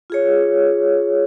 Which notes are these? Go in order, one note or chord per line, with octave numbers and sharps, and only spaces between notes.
F4 G#4 C#5